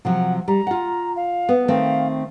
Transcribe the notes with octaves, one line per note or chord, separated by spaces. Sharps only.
C3 F3 F#3 F#5
G3 A#5
F4 F#5
F5
B3
D#3 A3 C4 F5